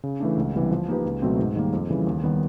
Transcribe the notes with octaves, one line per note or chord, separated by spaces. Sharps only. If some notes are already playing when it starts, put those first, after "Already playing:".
C#3
E3 A3 D4
C#2
C3 E3 G3 B3
F3
A#3 D#4 G4 B4
C#2
B2 F#3 A3 C4
G#2
D#3 G3 A#3
F2
C#3 E3 G3
D#2
D#3 G3 B3